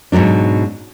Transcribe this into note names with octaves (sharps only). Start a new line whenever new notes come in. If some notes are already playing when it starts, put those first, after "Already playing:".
G#2 B2 E3 F#3 D4